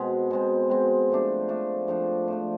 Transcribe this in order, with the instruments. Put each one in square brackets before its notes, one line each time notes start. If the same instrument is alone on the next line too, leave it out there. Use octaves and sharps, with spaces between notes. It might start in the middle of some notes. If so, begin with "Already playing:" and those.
Already playing: [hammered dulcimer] B2 G#3 C4
B2 G#3 C4
B2 G#3 C4
F3 A3 D4
F3 A3 D4
F3 A3 D4
F3 A3 D4